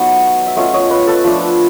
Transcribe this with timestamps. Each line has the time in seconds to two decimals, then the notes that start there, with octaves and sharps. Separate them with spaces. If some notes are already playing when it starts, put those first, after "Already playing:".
Already playing: F#3 A3 B3 D#4 C#5 D#5
0.47 E5
0.56 A3 C#4 F4 C#5 D#5
0.74 C#5 D#5
0.90 B4 C#5
1.07 A4 B4
1.24 F3 A3 D4